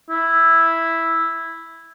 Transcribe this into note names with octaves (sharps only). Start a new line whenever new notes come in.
E4